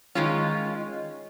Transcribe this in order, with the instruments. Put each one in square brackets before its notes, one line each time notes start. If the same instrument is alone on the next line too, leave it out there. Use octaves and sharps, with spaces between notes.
[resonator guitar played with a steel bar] D#3 G#3 C#4 F4